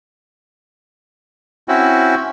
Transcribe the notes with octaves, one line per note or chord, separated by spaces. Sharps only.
C4 C#4 E4 F#4